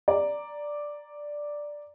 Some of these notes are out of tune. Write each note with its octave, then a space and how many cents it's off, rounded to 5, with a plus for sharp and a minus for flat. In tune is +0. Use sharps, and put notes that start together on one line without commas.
D5 +0 A#5 +0